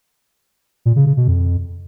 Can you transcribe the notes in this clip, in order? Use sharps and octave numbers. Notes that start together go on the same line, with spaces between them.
A#2
C#3
C#3
B2
F2